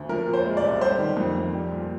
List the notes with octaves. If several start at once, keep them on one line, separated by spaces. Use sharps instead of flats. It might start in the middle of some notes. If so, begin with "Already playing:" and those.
Already playing: D2
F3 A#4
A#2
C5
G#3
D5
C2
G3 C5
D#3
F2
F2
G3
A#2